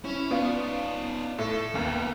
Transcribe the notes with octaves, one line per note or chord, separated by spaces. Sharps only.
C#4 E4
B3 D#4 F4 D5
A2 A4
D#2 A#3 B3